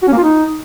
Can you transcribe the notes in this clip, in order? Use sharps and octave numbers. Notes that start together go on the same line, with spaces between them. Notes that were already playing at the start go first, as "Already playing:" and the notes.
F#4
C#4
A#3
F4
D#4